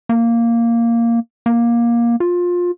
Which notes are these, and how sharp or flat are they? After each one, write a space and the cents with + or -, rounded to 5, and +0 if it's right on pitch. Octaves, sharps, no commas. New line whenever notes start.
A#3 -5
A#3 +15
F4 +20